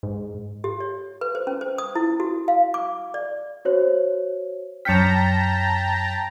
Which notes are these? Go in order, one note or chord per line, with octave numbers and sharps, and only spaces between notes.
G#2
G4
C#5
B4
C5
C#4
C5
D#6
E4
F#4
F5
D6
D5
F#4 C5 C#5
F#2 G5 A5 A#5 F6 G6 B6 C#7